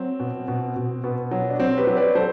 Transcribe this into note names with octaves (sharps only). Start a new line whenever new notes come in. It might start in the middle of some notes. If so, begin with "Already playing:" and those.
Already playing: F#3 C4
B2
B2
B2
B2 B3
F#3
D4
F#3 C4
G4 B4
F#3
B4 D5
F#3 A4 C5